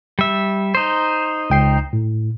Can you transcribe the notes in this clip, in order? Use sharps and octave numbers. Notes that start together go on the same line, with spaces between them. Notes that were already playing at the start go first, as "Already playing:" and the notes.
G3 E5
D#4 C5
C#2 G5 C7
A2